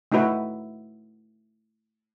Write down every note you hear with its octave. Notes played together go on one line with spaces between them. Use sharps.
A3 D#4 E4 F#4 B4 E5